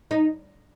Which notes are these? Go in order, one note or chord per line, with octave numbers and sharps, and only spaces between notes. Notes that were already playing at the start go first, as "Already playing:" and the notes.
D#4